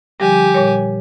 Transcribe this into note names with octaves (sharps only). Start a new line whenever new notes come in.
D3 F3 G3 G4 G#5
A#2 G3 C#5